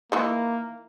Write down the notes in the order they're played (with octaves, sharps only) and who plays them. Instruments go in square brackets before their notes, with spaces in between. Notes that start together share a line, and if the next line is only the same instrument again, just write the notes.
[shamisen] D#3 E3 E4 [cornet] A#3